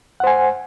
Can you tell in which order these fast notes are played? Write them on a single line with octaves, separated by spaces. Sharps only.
F#5 C5 G#5